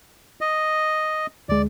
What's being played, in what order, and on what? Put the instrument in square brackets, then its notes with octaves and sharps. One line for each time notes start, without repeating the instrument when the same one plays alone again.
[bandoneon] D#5
[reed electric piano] D2 G#3 [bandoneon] D5